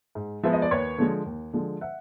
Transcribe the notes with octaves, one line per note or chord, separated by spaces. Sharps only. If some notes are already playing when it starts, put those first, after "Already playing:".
G#2
F3 G#3 B3 E5
D#5
D5
D#2 B4 C#5
D3 F3 G#3
D#2
D3 F3 G#3
E5 F#5